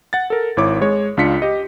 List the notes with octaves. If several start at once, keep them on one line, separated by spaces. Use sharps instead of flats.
F#5 A6
A4 A#4
G#1 E4 C#5 D6
G#3 C#5
C#2 D4 F4 B6 C#7
G4 D#5